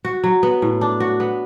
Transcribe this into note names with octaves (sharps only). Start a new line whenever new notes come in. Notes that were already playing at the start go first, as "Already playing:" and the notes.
F#4
F#3
B3
A2
D4
F#4
B3